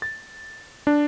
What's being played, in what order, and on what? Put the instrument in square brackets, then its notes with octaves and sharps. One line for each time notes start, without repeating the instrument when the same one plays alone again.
[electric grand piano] A6
D4